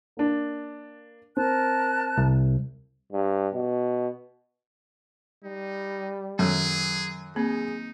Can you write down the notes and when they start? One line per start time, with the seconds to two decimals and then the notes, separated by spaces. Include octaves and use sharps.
0.17 A#3 D4
1.37 C4 A#4 A5 F#6
2.18 C2
3.12 G2
3.55 B2
5.44 G3 D#4
6.39 F#2 D#3 F#3 G#4 A4
7.36 A#3 C4 D#4 G#4